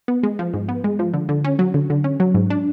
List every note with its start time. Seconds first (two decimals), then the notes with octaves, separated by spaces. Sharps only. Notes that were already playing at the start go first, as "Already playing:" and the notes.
0.08 B3
0.23 G#3
0.39 F3
0.54 G#2
0.69 B3
0.84 G#3
0.99 F3
1.14 D3
1.29 D3
1.45 C#4
1.59 F#3
1.74 D3
1.90 D3
2.04 C#4
2.20 F#3
2.35 G#2
2.50 D4